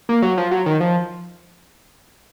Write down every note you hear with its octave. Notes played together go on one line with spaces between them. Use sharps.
A#3
F#3
F3
F#3
D#3
F3